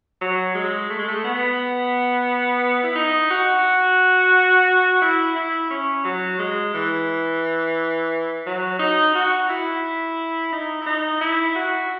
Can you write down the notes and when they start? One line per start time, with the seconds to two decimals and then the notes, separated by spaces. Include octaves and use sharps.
0.21 F#3
0.54 G#3
0.89 A3
0.98 G#3
1.08 A3
1.24 B3
2.83 E4
2.95 D#4
3.30 F#4
5.02 E4
5.36 E4
5.70 C#4
6.05 F#3
6.39 G#3
6.74 E3
8.46 F#3
8.79 D#4
9.15 F#4
9.49 E4
10.52 D#4
10.81 E4
10.86 D#4
11.21 E4
11.55 F#4